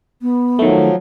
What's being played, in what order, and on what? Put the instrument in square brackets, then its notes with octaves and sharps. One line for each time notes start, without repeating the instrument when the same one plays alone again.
[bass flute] B3
[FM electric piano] D#3 A3 [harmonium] F3 F#3